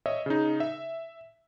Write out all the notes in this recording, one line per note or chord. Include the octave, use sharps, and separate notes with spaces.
C#5 D#5 E5
C#3 D#4
E5